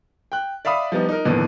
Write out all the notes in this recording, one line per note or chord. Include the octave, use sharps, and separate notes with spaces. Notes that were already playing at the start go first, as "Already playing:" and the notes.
G5 F#6
D5 E5 F5 B5 D#6
F3 G3 B3 D#4
D#4 A#4
A1 D#2 B2 D3 E3 F3